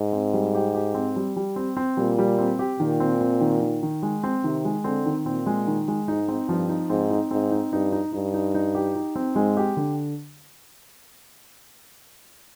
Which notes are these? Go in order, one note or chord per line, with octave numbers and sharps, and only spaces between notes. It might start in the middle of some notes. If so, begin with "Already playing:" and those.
Already playing: G#2
C4
G3
G4
G4
C4
G3
G3
C4
C4
A#2 G3
G3
C4
G4
A#2 D#3
C4
C4
D#3
D#3
D#3
G#3
C4
C3 D#3
G#3
D3 C4
D#3
A#2 C4
G#3
D#3
G#3
G#2 D#4
C4
G2 F3
D#4
G#2 C4
D#4
G#2 C4
D#4
G2 D#4
D#4
G2 D#4
D#4
D#4
G4
D#4
C4
G#2 G#3
G4
D3